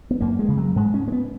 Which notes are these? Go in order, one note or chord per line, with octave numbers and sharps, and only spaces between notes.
B3
F#2 A#3
G#3
C#3
F#3
G#2 G#3
C#4
A#3
B3